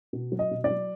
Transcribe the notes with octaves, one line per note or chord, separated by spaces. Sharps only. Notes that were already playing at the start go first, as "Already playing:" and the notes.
B2
F#3
D#5
B2
D5
F#3